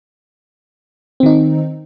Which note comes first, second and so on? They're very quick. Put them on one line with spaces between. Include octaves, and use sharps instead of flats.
C4 D#3 D#4